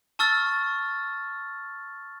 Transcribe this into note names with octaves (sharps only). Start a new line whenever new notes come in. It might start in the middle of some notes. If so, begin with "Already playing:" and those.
A5 C#6 E6 F6 A6